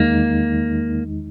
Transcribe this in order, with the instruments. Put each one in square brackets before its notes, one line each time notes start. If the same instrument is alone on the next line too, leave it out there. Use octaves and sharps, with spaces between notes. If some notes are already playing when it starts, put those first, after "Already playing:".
Already playing: [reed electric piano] E2 D#3 G#3 D#4 [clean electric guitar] A#3